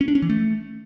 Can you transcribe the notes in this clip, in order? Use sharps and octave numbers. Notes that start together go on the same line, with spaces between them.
C#4
D4
C#4
E3
A3